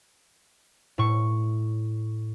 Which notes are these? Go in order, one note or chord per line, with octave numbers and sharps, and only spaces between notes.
A2 C#6